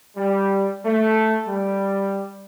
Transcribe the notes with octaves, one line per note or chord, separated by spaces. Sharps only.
G3
A3
G3